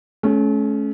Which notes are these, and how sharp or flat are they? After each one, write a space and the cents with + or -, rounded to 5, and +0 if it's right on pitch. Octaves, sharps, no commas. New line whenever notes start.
A3 -40 C#4 +0